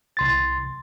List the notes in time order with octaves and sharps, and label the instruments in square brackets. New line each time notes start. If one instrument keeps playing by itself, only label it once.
[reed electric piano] C2 C6 A6